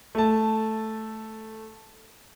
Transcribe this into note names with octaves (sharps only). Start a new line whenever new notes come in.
A3 A5